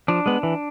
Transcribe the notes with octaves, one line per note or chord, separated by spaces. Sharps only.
F3 D4
G#3 B3
E3